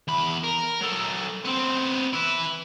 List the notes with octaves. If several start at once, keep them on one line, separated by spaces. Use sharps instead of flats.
E2 B5
A#4
F#3 A4
B3 C4
E4 B4